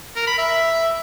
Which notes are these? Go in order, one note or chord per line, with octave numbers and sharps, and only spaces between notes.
A#4
B5
E5